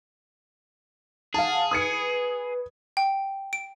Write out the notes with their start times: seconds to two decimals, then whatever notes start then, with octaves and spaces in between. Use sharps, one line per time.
1.34 G#4 F5 F#5 A5
1.71 B4 D#6 G#6 C#7
2.97 G5
3.53 D7